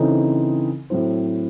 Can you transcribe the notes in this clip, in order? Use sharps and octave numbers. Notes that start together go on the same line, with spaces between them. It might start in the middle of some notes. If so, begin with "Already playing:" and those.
Already playing: C#3 E3 C4 D#4 A4
A2 F#3 C4 E4 C5